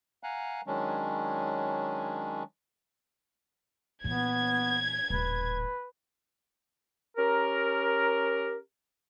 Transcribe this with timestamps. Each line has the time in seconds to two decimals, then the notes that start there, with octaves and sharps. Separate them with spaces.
0.23 F5 F#5 G#5 A#5 F#6
0.67 D#3 F#3 G#3 C#4 D4
4.04 A#2 E3 B3 G#6
5.10 D#1 A1 B4
7.17 C#4 G4 A#4